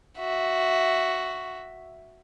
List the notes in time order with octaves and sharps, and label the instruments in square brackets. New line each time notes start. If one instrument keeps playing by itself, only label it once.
[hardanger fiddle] F#4 E5